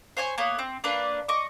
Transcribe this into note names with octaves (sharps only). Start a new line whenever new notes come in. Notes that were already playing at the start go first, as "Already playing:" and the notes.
C5 C#5 G#5 C#6
A#3 B3 C#5
C4
A#3 D4 B4
D#5 C#6 D6